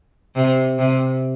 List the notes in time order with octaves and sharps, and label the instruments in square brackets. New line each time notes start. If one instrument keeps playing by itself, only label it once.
[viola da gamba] C3
C3